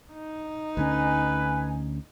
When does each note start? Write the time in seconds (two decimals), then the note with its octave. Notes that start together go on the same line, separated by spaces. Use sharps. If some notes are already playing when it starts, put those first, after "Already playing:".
0.13 D#4
0.77 D2 D3 C#4 B4 G#5